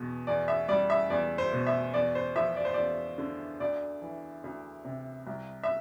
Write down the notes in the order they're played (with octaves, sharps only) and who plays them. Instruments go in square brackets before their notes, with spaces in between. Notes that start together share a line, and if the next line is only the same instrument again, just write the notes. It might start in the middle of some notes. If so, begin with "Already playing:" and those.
Already playing: [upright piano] E2 B2
E2 D5
E5
G3 D5
E5
E2 D5
C5
B2
E5
E2 D5
C5
F3 E5
D5
C5
E2 D5
D3
D2 D5
E3
D2
C3
C2
E5